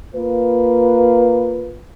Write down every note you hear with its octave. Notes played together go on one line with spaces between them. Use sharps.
A#3 F4 B4